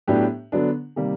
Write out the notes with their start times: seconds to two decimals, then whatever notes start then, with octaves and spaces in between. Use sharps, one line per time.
0.07 A2 F#3 B3 D4 G4
0.52 D3 F#3 B3 D4
0.96 C3 D#3 G3 A#3